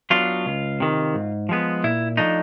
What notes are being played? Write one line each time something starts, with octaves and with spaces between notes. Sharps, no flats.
F#3 B3 D4 F4
C#2
C3 D#3
G#2
F3 G#3 B3
A#2 E4
F3 A3 D4 D#4